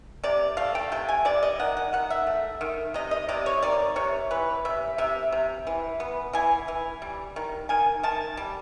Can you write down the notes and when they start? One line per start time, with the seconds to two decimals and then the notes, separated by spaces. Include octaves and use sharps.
0.24 C3 D5
0.57 A3 F5
0.75 G5
0.92 C3 G5
1.09 G#5
1.25 C3 D5
1.43 D#5
1.60 D#3 F#5
1.77 F#5
1.93 D#3 F#5
2.10 E5
2.27 A3
2.61 D#3
2.94 C3 D#5
3.11 D#5
3.29 C3 D5
3.46 C#5
3.62 D#3 D5
3.96 C3 C#5
4.31 E3 B4
4.65 C3 E5
4.98 C3 E5
5.32 C3
5.67 E3
6.00 B3
6.33 E3 G#5
6.68 E3
7.02 G3
7.36 D#3
7.69 D#3 G#5
8.03 D#3 A5
8.37 G3